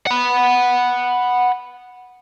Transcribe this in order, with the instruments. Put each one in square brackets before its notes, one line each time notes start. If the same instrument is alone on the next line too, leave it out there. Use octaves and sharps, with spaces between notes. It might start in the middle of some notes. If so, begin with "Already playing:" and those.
[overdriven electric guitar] F#5 B5